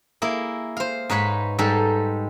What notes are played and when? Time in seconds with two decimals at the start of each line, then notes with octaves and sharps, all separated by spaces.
0.22 A#3 E4 G#4
0.77 C5 F5
1.10 G#2 D#4 B4 C#5 B5
1.59 G#2 G3 G#3 D#4 A4